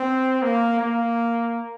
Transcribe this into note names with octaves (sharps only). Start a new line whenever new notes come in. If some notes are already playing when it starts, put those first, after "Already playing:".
Already playing: C4
A#3
A#3